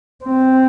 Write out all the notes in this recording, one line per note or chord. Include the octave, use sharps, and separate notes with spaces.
C4